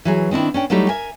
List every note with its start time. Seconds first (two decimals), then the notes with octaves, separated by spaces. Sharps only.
0.05 E3 F#3 G#4
0.31 D#3 C4 D4 E4
0.54 C#4 D4 G5
0.70 F#3 G3 A3 D#4 E4 G4
0.88 A#4 E5 G#5